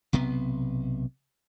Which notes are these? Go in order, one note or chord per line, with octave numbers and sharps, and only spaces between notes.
B1 C3 B3